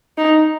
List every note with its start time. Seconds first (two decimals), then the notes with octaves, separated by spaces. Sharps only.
0.18 D#4